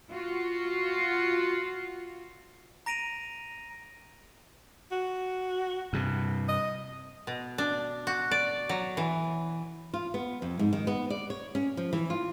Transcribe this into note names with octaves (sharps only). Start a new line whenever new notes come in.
F4 F#4
A#5 A#6 D7 D#7 F7
F#4
G2 C3
D#5
B2
D4
F#4
D5
F#3
E3
F4
B3
F2
G#2
D#3
B3
D5
C#5
C#4
F3
E3
F4